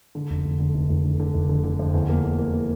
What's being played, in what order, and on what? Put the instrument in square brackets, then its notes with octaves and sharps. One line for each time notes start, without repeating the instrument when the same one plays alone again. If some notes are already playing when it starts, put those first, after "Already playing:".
[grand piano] D3
F1
F1
D3
F1
F1
D3
D3
F1
D3
D3
F2
E2
A#3
A#3
A#3
A#3